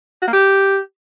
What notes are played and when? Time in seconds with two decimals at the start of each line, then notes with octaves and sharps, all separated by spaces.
0.22 F#4
0.28 A#3
0.33 G4